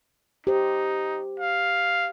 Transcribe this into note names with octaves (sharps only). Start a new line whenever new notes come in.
D#4 G4 C5
F5